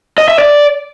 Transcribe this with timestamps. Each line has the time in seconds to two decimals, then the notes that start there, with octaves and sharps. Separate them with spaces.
0.18 D#5
0.28 E5
0.39 D5